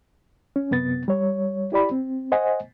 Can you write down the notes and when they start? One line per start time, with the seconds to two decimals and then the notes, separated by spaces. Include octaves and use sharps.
0.56 C#4
0.71 F#2 C3 B3 A6
1.08 G3 C#5
1.72 E4 G4 D5 B5
1.91 C4
2.32 C5 D#5 F#5 G#5